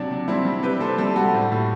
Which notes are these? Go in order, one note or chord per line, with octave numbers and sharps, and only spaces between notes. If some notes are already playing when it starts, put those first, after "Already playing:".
Already playing: C3 F#3 D4
C3
G3 C4 E4
G3
C3 G4 B4
C3 A4 C5
G3 A4 C5
G3 F#4 A4
A2
A2